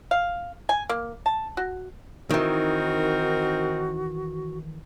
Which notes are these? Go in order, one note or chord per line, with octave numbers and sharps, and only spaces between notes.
F5
G#5
A#3
A5
F#4
D#3 E3 C4 D#4 F#4 A#4